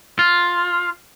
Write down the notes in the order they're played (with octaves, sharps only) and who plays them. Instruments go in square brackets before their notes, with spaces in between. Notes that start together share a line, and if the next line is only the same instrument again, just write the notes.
[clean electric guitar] F4